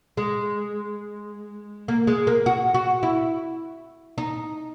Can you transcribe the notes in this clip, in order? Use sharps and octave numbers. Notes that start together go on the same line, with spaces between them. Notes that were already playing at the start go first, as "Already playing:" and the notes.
G#3
A#3
G#3
A#3
F#4
F#4
E4
D#4